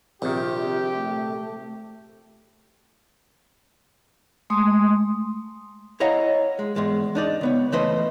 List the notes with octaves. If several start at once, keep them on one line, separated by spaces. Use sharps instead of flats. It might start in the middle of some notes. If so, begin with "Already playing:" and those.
A#1 C3 D#3 F4 G4
A3
G#3 A3 C6 D#6
E4 C#5 D#5 F5 F#5 A#5
G#3
E2 G#2 G#3
D4 D#4 D5
C#2 B3 C#5
E3 A3 B4 C5 D#5